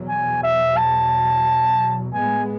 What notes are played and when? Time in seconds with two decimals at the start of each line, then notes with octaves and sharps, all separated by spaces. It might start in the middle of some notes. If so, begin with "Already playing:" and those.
Already playing: E2 B2 F#3
0.08 G#5
0.43 E5
0.77 A5
2.14 A2 G#3 B3 G#5